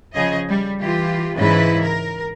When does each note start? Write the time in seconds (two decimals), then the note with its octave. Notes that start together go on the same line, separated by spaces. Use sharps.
0.14 C#3 F3 G#4 D#5
0.47 G3
0.80 E3 F4 G4
1.35 G#2 C#3 E3 E4 B4
1.83 A#4